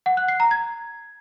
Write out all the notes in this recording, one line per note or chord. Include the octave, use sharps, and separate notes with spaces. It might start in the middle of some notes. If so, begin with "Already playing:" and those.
F#5
F#6
C7
A#5
G#6